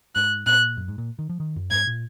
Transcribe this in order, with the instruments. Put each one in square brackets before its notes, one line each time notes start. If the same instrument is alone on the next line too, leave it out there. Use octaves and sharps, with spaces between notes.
[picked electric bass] G#2 [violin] F#6
[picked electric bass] A#2 [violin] F#6
[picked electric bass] F#2
G#2
A#2
D#3
F3
D#3
F#2
[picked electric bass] G#2 [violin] G#6
[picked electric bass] A#2